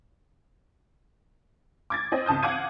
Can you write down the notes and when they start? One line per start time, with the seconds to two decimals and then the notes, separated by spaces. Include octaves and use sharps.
1.90 D6 G#6 A6
2.12 C4 D#5
2.26 G#1 C#2 A5 D#6 G6
2.43 F5 F#5 D6 G#6 D#7